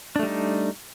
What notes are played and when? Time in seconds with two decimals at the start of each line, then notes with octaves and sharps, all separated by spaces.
0.16 D4
0.19 A3
0.23 G3
0.27 D#4